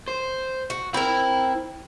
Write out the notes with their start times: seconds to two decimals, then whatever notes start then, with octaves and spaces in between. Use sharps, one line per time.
0.08 C5
0.70 F#4
0.94 C4 E4 A#4 B5